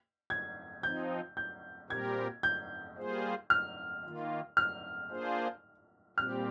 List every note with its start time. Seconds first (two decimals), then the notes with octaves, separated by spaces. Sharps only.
0.30 G#6
0.83 F3 C4 D#4 G6
1.37 G6
1.90 A#2 G3 C4 G4 A#4 G#6
2.43 G6
2.97 G3 A#3 F4 G#4 C5
3.50 F6
4.04 D#3 A#3 F4
4.57 F6
5.10 A#3 D4 F4 G#4 C5
6.17 A#2 G3 C4 G4 F6